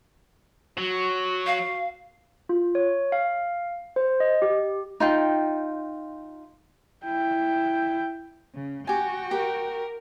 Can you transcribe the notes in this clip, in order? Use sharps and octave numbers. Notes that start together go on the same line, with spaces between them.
F#3 F#4
F5
F4
C#5
F5
C5
D#5
G4
D#4 F4 G5
E4 G5
C#3
F#4 G4 G5 G#5
G4 A#4